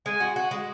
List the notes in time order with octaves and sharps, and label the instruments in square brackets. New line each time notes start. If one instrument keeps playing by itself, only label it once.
[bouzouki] G#3 [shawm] G#5
[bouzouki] F#4
F#4
G#3